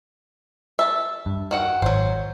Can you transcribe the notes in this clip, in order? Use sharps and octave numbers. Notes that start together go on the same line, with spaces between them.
E5 A5
G2
D#3 F#4 F#5
G#1 F#3 C5